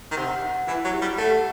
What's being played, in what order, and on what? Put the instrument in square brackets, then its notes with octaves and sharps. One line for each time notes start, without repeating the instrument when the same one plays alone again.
[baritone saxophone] D#3
[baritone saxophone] C3 [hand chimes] F#5
[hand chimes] F#5
[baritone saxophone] E3 [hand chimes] E4
[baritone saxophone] F#3
[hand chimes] G4
[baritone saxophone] G3
[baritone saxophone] A3 [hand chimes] F#5